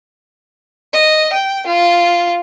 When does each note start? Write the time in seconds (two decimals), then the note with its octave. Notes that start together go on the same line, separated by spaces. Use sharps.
0.93 D#5
1.32 G5
1.66 F4